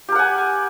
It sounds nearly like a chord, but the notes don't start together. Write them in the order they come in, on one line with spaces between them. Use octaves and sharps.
G4 A#4 F#5 G#5